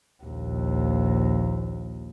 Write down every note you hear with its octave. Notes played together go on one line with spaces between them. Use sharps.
A#1 D#2